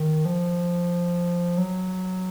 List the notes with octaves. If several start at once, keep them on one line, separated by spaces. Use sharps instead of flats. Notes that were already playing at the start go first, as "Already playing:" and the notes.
Already playing: D#3
F3
F#3